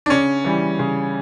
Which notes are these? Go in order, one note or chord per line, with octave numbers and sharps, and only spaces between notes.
D4
C#3 C#4
E3 G3
C#3